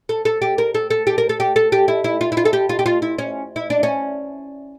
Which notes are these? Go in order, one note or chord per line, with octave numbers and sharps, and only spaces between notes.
A4
A4
G4
A#4
A4
A4
G4
A#4
A4
G4
A4
G4
E4
E4
F4
E4
F4
A4
G4
F4
G4
F4
E4
C#4
E4
D4
C#4